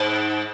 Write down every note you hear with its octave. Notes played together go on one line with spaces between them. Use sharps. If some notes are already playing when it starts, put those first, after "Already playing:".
Already playing: G#2